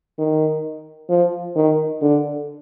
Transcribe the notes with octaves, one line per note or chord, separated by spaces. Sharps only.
D#3
F3
D#3
D3